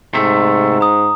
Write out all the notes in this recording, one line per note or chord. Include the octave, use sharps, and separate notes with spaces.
G#2 C3 A3
A#5 D#6